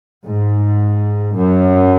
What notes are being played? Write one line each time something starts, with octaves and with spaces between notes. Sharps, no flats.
G#2
F#2